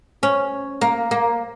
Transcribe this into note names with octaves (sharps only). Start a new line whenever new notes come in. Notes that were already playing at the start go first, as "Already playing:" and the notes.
C#4
A#3
A#3